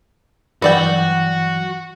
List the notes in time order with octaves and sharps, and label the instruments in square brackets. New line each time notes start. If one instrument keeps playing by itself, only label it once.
[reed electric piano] G2 E3 F#3 [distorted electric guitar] F#4 [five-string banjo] B4 D5 G5